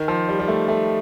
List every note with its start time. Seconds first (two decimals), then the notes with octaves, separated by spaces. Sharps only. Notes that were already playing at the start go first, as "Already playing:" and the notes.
Already playing: D#3
0.08 F3
0.29 G3
0.39 G3
0.48 A3
0.68 A3